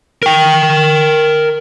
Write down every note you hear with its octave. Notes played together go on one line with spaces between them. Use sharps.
A#4 G5